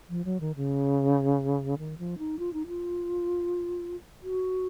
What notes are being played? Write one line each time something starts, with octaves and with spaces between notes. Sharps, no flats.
F3
F#3
D#3
C#3
D#3
F3
D#4
F4
D#4
F4
F#4